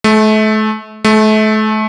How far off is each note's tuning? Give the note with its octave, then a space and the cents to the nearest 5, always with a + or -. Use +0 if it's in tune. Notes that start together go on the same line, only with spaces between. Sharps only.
A3 -35
A3 -35